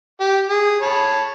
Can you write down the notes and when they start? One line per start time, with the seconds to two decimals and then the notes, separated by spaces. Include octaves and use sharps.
0.20 G4
0.50 G#4
0.82 C#5 A5 B5